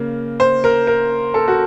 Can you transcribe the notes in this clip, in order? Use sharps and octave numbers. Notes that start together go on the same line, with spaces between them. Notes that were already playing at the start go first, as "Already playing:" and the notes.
Already playing: C#3 A#3
C5
A#4
A#4
A4
F#4